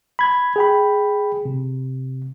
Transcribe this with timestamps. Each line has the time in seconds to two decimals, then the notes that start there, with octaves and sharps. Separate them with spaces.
0.19 B5 G#6
0.56 G#4 G5 B5
1.45 C3